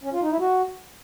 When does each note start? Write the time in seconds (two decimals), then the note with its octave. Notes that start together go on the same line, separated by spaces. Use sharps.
0.04 C#4
0.13 F4
0.22 D#4
0.31 E4
0.40 F#4